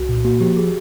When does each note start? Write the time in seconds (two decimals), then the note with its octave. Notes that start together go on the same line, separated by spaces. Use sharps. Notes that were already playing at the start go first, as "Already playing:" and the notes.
Already playing: C2 F#4
0.09 A#2
0.25 A#3 F#4
0.41 F3 G4
0.57 G#4